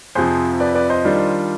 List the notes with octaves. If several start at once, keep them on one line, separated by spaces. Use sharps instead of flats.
F2 C3 F3 G#4 C5
B4 D5
B4 D5
C5 D#5
D#3 G3 D4 F4